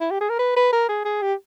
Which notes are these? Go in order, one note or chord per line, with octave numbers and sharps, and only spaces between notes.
E4
G4
G#4
A#4
B4
B4
A#4
G#4
G#4
G4